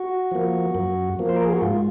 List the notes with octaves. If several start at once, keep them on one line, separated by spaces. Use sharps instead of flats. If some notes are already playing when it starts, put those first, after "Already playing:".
Already playing: F#4
F3 A#3
F#2
F3 A#3
C5
A#4
G#4
F#4
G#2 F4